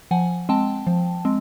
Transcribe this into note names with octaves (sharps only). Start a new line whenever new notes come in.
F3 F#5 G#5
G#3 C4 G5 A5
F3
G#3 C4